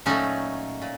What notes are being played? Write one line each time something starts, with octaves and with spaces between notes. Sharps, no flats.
A#2 F#3 A3 C#4 D#4
A#2